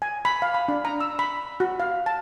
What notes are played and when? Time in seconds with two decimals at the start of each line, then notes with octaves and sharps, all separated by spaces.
0.02 G#5
0.25 B5
0.42 F5
0.54 B5
0.68 D4
0.85 A#5
1.01 E6
1.19 B5
1.60 F#4
1.80 F5
2.06 A5